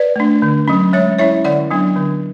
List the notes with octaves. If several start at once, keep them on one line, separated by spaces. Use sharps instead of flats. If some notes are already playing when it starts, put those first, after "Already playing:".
Already playing: B4 D5
A3 D4
D3
F#3 C#4
G#3 C#5 E5
C#4 E4 C#5 E5
D3 D5 F#5
F#3 B3 D4
D3